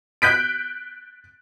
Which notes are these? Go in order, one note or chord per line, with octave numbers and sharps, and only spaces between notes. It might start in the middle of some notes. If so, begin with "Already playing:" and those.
F#6 G6 B6 D7